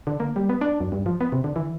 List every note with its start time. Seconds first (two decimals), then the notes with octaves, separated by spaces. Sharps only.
0.07 D3
0.20 A#3
0.36 G3
0.49 B3
0.61 D4
0.80 F#2
0.92 G2
1.06 F3
1.21 B3
1.32 C3
1.44 D3
1.56 E3